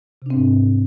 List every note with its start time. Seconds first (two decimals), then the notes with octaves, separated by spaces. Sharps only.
0.22 C3
0.26 D4
0.30 C4
0.35 G#2